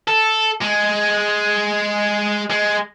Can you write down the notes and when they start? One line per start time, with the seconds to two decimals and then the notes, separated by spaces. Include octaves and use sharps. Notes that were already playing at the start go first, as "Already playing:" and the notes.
0.08 A4
0.61 G#3
2.50 G#3